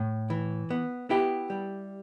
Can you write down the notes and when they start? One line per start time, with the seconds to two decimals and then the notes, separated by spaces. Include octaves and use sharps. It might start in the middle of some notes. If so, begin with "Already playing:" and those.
Already playing: A2
0.30 E3
0.70 B3
1.09 B3 E4 G4
1.50 G3